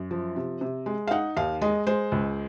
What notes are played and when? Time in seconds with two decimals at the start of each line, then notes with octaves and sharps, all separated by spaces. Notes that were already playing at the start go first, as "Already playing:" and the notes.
Already playing: F#2
0.11 F3
0.36 C3
0.61 C3
0.86 G#3
1.07 F5
1.11 D#4 F#5
1.36 D#2 F5
1.61 G#3 D#5
1.87 G#3 C5
2.12 C#2